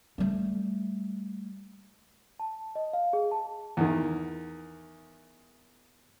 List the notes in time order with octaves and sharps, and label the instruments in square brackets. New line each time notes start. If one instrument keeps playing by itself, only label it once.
[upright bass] G3 A3
[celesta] A5
D#5
F5
G#4
A5
[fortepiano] E2 D#3